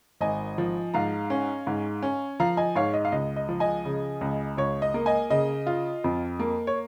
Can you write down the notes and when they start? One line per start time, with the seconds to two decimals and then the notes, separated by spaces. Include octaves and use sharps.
0.21 G#1 D#5 G#5
0.58 F3
0.94 G#2 F5 A#5
1.30 C#4
1.67 G#2
2.03 C#4
2.40 F3 F5 A#5
2.57 D#5 G#5
2.75 G#2 C#5 F5
2.94 D#5
3.05 F5
3.12 C#2 D#5
3.36 D#5
3.49 F3
3.60 D#5 G#5
3.85 C#3
4.21 C#2
4.57 C#2 C#5
4.82 D#5
4.94 A#3
5.06 D#5 G#5
5.30 C#3 D#5
5.66 F4
6.04 F2
6.40 A#3
6.67 C#5